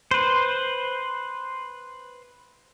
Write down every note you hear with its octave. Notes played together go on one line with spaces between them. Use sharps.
B4 C5